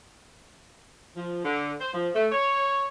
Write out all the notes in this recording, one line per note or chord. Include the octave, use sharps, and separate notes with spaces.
F3
D3
C5
F3
A3
C#5